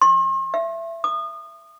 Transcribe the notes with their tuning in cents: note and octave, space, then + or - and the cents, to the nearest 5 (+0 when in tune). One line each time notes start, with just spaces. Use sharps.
C6 +45
E5 +20
D#6 -30